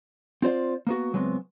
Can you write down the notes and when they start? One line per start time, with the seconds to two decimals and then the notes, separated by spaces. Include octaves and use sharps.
0.42 C4 F4 C5 D5
0.87 A#3 B3 F#4
1.13 C#2 F#3 G#3 B3 C4